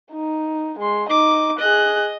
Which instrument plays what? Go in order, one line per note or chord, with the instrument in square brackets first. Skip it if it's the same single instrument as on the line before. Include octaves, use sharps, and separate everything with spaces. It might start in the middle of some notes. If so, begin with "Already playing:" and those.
[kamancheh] D#4
G#3 C6
[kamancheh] D#4 D#5 [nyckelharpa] D6
[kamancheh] G#4 F#6 [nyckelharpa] D#5